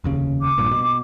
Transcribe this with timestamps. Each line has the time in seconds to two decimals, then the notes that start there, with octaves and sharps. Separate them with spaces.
0.04 F1 D#2 C#3
0.42 D6
0.58 A#1 G2 A#2
0.71 B2